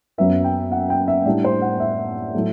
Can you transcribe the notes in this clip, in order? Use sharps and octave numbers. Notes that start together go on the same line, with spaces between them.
F#2 F#3 B3 E5
G5
F#5
G5
E5
A2 G3 D4 D5
C5
F#5
E5
A2 F#3 A3